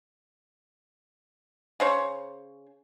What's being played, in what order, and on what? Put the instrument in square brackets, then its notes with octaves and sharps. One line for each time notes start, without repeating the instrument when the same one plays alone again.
[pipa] C#3 C5 C#5